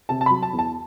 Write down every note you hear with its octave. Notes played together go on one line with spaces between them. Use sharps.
C3 A5
A5
F#3 B5
A5
E2
A5